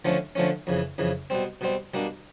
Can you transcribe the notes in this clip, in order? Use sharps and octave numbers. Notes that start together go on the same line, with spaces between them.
D3 F3 A3 C#4
D3 F3 A3 C#4
F2 C#3 E3
F2 C#3 E3
B2 G3 C4
B2 G3 C4
B2 G3 A#3 D4